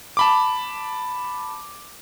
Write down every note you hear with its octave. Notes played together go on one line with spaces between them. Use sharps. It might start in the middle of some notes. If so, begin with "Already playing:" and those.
A5 B5 D6